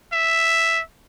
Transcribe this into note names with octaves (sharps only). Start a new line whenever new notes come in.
E5